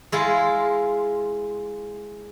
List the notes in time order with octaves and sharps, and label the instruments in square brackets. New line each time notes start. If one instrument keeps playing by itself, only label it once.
[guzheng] G#3 E4 F4